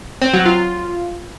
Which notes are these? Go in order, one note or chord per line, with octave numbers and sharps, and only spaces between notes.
C4
F#3
F4